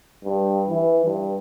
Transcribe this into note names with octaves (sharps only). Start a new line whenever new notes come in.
G2
E3
G2